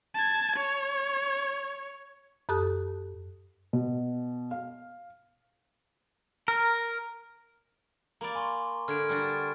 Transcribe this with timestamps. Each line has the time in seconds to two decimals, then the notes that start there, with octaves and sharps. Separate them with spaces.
0.15 A5 G#6
0.57 C#5
2.49 F#2 G4 A4 A5 D#6 F#6
3.73 B2
4.51 F5
6.48 A#4
8.21 A#3 D5 A#5 B5 D6
8.35 G#5 C6 C#6
8.88 D3 F6 G#6 D7
9.09 G3 D4 F#4 F6 A6